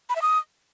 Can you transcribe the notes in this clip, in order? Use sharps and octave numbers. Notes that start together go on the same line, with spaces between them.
B5
E5
D#6